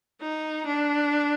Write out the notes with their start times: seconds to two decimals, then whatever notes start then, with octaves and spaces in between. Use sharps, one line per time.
0.21 D#4
0.66 D4